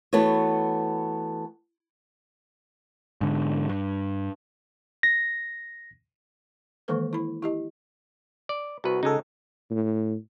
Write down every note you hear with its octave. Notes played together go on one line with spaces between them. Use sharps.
E3 A3 B3 F#4 B4 C#5
G#2 D3
G2
A#6
D#3 E3 G#3 A#3 A4 B4
E4 B5
E4 G4 D#5
D5
C2 F#4 B4
C#3 G#3 D#4 A4
A2